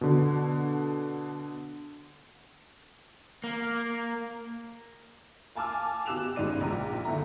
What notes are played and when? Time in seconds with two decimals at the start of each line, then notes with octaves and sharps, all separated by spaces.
0.01 B2 D3
3.44 A#3
5.55 F5 G#5 A5 D6 E6 F6
6.06 B2 G4 E6 F#6 E7 F7
6.36 A1 G#2 C#3 D#4 D5 D#7
6.61 A#1 A#5
7.05 G1 E2 A3 E5 A#5